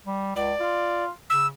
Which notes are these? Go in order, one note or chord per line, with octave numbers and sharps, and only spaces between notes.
G3
C#2 D5
F4
C#3 E6